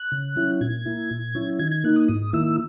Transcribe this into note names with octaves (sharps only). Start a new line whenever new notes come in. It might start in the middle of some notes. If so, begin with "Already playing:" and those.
Already playing: F#6
C#3
F#3 C#4 E4
A#2 G#6
A#3 E4
A#2
F#3 C#4 E4
D#3 G#6
G#6
A#3 D#4 F#6
D#6
G#2 D#6
D#3 A#3 E4 E6